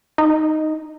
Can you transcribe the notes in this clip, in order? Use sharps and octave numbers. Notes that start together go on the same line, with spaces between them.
D#4